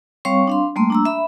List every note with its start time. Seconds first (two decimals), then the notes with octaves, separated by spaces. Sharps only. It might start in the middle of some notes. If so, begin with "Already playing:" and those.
0.25 G3 C4 C#5 F5 C#6
0.47 D4 F5 C6
0.76 G3 A3 A#3 C6
0.90 D4 A#5 E6
1.05 E5 B5